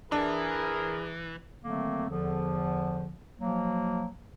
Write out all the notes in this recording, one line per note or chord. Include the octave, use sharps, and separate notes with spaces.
E3 D4 E4 G#4 A#4
D3 D#3 F#3 A3 A#3 C4
E2 D3 F3
B2 F3 F#3 A#3